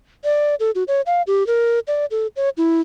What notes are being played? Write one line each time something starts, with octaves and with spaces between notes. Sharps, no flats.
D5
A4
F#4
C#5
F5
G4
A#4
D5
A4
C#5
E4